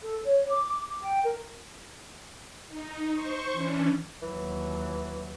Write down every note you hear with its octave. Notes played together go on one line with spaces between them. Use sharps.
A4
C#5
D6
D6
D6
G5
A#4
D#4
C5 C#6
E3 C#4 D4
D#2 E3 F#3